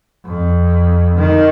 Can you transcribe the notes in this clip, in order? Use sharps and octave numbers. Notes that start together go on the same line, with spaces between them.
F2
D#3